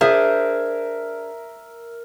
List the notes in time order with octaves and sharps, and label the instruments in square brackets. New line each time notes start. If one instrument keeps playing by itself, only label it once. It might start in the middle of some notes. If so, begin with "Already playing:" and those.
[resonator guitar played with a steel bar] D4 G#4 C5 [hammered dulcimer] A#4 [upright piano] E5